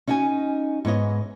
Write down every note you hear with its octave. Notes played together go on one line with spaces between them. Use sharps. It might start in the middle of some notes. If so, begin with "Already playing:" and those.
C#4 D#4 F#4 D#5 G#5
G#2 B3 C#5 D#5